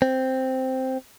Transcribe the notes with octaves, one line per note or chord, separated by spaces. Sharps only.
C4